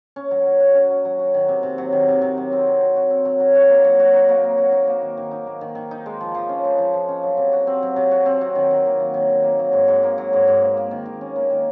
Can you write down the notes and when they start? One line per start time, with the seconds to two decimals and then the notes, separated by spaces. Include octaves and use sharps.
0.16 C#4
0.31 F#3
0.46 F#3
0.60 F#4
0.75 C#4
0.90 F#3
1.05 F#3
1.19 F#4
1.34 D#3
1.48 C3
1.63 C3
1.78 F#3
1.92 D#3
2.08 C3
2.22 C3
2.38 F#3
2.52 C4
2.67 F#3
2.81 F#3
2.96 F#4
3.10 C4
3.25 F#3
3.40 F#3
3.55 F#4
3.69 A#3
3.84 F#3
4.00 F#4
4.13 D#4
4.29 A#3
4.43 F#3
4.58 F#4
4.72 D#4
4.87 A#3
5.02 D#3
5.17 D#3
5.31 D#4
5.47 A#3
5.61 D#3
5.75 D#3
5.91 D#4
6.06 G#3
6.21 F3
6.35 F3
6.49 C#4
6.65 G#3
6.78 F3
6.94 F3
7.09 C#4
7.23 F#3
7.37 C3
7.53 F#4
7.67 C4
7.83 F#3
7.96 C3
8.11 F#4
8.26 C4
8.41 F#3
8.55 D#3
8.71 D#3
8.86 A#3
9.00 F#3
9.14 D#3
9.30 D#3
9.44 A#3
9.59 F#3
9.73 G#2
9.88 G#2
10.03 A#3
10.18 F#3
10.33 G#2
10.47 G#2
10.62 A#3
10.77 A#3
10.91 D#3
11.06 D#3
11.21 C#4
11.36 A#3
11.50 D#3